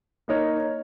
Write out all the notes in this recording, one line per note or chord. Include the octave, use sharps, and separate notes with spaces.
A#3 D#4 A#4 C#5